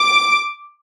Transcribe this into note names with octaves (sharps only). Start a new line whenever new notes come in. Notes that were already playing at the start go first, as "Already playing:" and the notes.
Already playing: D6